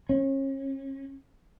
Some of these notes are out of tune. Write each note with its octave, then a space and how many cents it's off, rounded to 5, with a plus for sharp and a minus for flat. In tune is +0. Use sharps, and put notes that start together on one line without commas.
C#4 -35